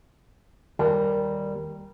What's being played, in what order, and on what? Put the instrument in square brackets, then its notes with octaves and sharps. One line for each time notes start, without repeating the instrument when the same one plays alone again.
[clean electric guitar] D#2 G3 [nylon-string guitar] A#4